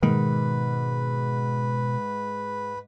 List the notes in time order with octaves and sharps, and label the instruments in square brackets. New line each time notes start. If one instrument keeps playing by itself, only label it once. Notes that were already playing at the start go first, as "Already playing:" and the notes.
[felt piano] G#2 [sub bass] B2 [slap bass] D#3 [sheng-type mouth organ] B4